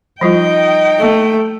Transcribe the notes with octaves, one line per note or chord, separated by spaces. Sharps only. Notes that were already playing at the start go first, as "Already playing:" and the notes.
F3 G3 D#4 F4 D#5 G5
A3